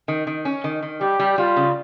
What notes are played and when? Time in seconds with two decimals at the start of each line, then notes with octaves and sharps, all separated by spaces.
0.08 D#3
0.27 D#3
0.45 C#4
0.64 D#3
0.82 D#3
1.01 G3 G4
1.19 G3
1.38 G3 F4
1.56 C#3